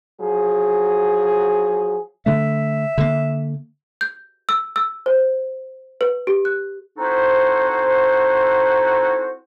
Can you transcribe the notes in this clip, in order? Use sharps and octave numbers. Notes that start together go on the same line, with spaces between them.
F3 F#3 G#4
D3 A3 E5
D3 A#3
G6
E6
E6
C5
B4
G4
F#6
C4 D#4 E4 F#4 A4 C5